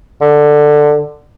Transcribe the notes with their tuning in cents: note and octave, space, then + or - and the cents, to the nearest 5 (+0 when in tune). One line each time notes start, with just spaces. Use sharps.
D3 +10